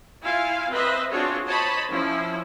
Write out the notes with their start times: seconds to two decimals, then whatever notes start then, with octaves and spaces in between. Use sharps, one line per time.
0.22 E4 F4 F5 G#5
0.70 C4 B4 C5 D#5 E5
1.11 C4 D4 F4 F#4 G#4 C#5
1.46 C5 C#5 D#5 A5 B5
1.90 F3 C#4 E4